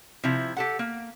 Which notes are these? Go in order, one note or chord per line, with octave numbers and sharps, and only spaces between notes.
C3 F3 E4
G4 A4 F#5
A#3